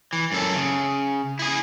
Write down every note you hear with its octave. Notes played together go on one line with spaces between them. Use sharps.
E3
F#2 A4
C#3
E4 G#4